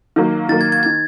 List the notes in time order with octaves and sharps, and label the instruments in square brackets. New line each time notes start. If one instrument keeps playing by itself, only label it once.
[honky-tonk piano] D#3 F#3 A#3
[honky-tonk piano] D#3 F#3 A#3 [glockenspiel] A6
[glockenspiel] G#6
G#6
[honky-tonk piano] D#3 [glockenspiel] G#6